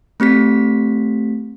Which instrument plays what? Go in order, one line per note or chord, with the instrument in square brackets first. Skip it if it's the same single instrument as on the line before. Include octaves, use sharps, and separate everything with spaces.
[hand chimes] A3 C4 G4 B6